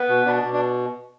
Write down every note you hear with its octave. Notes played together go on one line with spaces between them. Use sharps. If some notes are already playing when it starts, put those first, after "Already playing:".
Already playing: B3 B4
B2
B2 D4
B2
D4